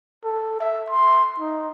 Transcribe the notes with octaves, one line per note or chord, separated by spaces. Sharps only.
A4
E5
C6
D#4